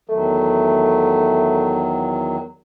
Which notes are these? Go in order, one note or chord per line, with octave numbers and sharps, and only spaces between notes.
E2 D#3 F#3 A3